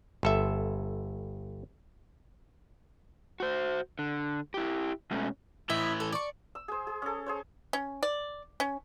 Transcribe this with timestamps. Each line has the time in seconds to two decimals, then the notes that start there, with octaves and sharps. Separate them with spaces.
0.23 G1 A4 E5
3.40 F#4 C5
3.99 D3
4.54 E4 G4
5.11 B2 G#3 A3 C#4
5.70 A2 E3 E4 D#5 E5
6.00 A4
6.13 D5 C#6
6.55 E6
6.68 G#4 C5
6.87 G#4
7.02 C#4 A4
7.26 G#4 C5 C#5
7.73 C#4
8.03 D5
8.60 C#4